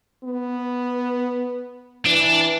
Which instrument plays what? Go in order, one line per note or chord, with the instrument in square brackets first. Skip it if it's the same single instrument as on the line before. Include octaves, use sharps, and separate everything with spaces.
[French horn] B3
[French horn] E3 [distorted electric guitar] D4